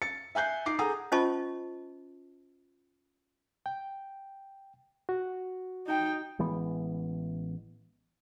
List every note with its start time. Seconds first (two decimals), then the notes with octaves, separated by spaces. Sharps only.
0.02 A6 C#7
0.35 E5 G#5 F#6 G6 C7
0.66 D#4 D6 C7
0.79 G#4 A4 F#5 G#5 A#5 D#6
1.12 C#4 F4 C5 D#5 A5 C#6
3.66 G5
5.09 F#4
5.87 D#4 G5
6.39 A1 E3 G#3 B3